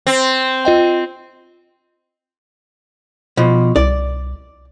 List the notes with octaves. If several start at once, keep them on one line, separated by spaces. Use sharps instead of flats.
C4
F4 D#5 G5
B2 F3
C2 D5